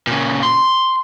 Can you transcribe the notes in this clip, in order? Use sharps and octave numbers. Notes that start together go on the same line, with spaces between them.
A#2 C#3
C6